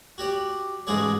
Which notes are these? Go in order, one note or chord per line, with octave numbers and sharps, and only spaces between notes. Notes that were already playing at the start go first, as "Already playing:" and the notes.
F#4 G4 D5
A1 G#2 G#3 F#4 G#4 D5